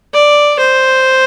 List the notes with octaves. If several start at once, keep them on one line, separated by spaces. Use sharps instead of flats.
D5
C5